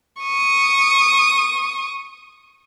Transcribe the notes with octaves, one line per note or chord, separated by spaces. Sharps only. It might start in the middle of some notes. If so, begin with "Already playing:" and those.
C#6 D#6